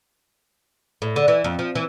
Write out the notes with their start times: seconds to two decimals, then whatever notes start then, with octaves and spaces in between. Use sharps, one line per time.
1.02 A2
1.16 D3
1.28 E3
1.44 F2
1.59 F3
1.75 E3